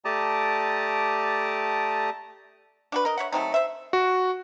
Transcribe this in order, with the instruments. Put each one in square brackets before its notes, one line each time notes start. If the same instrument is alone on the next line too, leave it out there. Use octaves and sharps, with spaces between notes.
[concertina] A3 G4 D5 A5 A#5 D#6
[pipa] D4 F#4 B4
A#4 D#5
C#5 E5 F#5
F#3 A3 C4 D#4
C5 E5
[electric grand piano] F#4